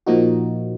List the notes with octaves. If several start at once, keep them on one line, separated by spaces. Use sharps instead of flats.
A#2 F3 A#3 D#4 F#4